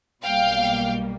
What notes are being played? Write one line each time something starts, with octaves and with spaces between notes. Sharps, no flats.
B1 B2 G3 A#3 F5 G5